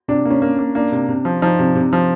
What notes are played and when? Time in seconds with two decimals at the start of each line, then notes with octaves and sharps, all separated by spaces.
0.08 C3 D4
0.25 A#3
0.30 C#4
0.42 A#3
0.59 A#3
0.75 A#3 D4
0.92 C3
1.09 C3
1.25 F3
1.42 F3 D#4
1.59 C3
1.75 C3
1.93 F3